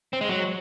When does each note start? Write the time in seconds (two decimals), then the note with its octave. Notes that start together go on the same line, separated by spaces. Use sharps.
0.13 C4
0.21 G#3
0.29 F#3